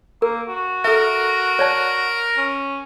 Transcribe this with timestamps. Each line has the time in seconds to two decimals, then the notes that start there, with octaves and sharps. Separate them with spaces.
0.22 A#3 A#4
0.48 F#4
0.85 A4 A#4 E5
1.59 C#5 D5 A5
2.37 C#4